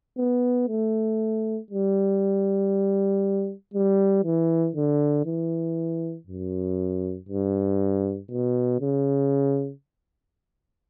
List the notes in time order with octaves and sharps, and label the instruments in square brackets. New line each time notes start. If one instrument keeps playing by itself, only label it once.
[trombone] B3
A3
G3
G3
E3
D3
E3
F#2
G2
B2
C#3